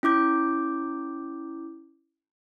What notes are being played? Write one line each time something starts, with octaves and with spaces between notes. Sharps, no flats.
C#4 E4 D6 G6